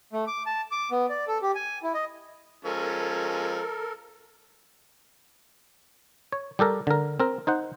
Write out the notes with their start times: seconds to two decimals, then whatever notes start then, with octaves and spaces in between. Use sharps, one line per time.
0.13 A3
0.27 D6
0.46 A5
0.71 D6
0.91 B3
1.09 D5
1.28 A4
1.42 G4
1.55 G#5
1.83 E4
1.94 D#5
2.65 F3 G#3 C#4 A4 A#4
6.32 C#5
6.59 G3 G4 A4 A#4
6.87 D3 A#4
7.20 C4 A#4
7.47 D#4 C5 F#5